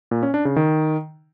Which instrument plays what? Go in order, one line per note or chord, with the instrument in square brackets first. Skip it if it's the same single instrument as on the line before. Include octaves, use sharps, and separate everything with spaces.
[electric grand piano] A#2
C#4
D4
C#3
D#3